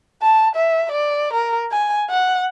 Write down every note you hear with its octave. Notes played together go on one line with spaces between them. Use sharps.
A5
E5
D5
A#4
G#5
F#5